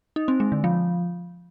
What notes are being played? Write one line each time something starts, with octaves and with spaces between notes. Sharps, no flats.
D#4
C4
G#3
D3
F3